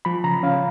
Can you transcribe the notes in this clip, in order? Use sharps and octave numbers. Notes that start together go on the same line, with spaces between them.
F3 B5
C#3 A#5
C#4 F5